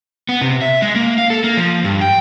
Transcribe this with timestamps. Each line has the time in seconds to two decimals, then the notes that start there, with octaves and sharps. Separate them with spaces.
0.29 B3
0.41 C3
0.62 E5
0.82 G#3
0.96 A#3
1.18 F5
1.30 A4
1.44 A#3
1.57 F3
1.84 G2
2.01 G5